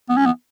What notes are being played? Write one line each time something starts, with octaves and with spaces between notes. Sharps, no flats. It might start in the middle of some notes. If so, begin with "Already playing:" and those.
B3
C#4
B3